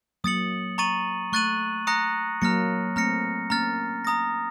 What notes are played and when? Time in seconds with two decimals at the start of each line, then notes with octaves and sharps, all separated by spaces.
0.24 F#3 A#3 D#6 A6 C#7 F#7
0.78 A#5 C#6 A6 D#7 F#7
1.32 A3 C#6 F#6 A6 D#7 F#7
1.87 A#5 D#6 F#6 A#6 C#7
2.42 F#3 A#3 A#5 F6 A#6 C#7
2.96 A3 C4 A#5 F6 A#6 C#7
3.50 A#3 C#4 A#5 F6 A6
4.05 A#5 D#6 A#6